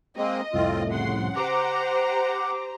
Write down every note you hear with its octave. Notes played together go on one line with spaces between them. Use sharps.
G#3 A#3 C4 D#5
C2 F2 A2 C4 F4
C#3 F#5 C6
G4 C5 A#5 D6